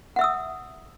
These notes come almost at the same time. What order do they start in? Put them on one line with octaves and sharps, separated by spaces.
F#5 E5 E6 D#6